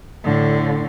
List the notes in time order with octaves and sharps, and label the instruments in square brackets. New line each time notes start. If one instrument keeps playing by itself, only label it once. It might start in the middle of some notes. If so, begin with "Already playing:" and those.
[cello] A2 D3